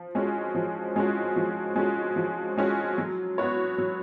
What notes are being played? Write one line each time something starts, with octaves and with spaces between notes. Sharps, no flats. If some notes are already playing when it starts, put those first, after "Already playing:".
Already playing: F3
G#3 C#4 F#4
F3
G#3 C#4 F#4
F3
G#3 C#4 F#4
F3
G#3 C#4 F#4
F#3
B3 F#4 C#5
F#3